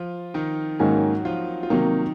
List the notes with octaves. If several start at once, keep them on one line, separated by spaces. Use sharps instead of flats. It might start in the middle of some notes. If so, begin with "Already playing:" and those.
Already playing: F3 F4
D#3 D#4
G#2 D#3 F#3 A#3 C#4 F#4
F3 F4
F4
C3 D#3 F#3 A#3 D#4